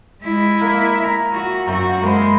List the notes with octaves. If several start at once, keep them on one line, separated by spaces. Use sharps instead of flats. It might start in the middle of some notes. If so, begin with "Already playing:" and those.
G#3 E4
A#3
E5 A#5
F#4
F#2 F#4 E5 G5 A#5
G#3 A#3 C5 B5